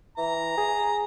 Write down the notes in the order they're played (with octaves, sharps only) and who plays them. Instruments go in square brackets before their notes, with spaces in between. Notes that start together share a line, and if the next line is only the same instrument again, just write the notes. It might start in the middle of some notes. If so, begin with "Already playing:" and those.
[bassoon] E3 [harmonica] A#5
[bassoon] G#4